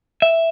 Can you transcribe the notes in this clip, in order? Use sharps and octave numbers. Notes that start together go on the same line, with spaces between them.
E5